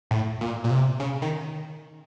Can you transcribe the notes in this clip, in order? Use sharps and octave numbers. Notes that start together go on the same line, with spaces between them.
A2
A#2
A#2
C3
C#3
D#3